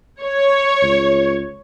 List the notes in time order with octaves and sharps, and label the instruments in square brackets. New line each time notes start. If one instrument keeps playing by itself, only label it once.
[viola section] C#5
[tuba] C#2